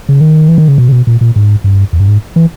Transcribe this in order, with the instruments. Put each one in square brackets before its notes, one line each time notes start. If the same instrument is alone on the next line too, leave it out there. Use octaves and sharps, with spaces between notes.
[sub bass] C#3
D#3
E3
D#3
C#3
B2
C#3
B2
A#2
A#2
G#2
G2
E2
G2
G#2
E3